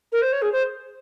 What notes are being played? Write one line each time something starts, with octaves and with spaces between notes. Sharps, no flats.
A#4
C5
C#5
G#4
C5